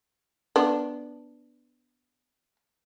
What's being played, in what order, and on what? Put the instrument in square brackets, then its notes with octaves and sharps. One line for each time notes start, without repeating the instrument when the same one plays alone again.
[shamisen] B3 D4